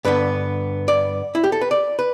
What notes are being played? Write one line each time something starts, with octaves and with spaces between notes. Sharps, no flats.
G2 D3 B3 B4
D5
E4
G4
A4
B4
D5
B4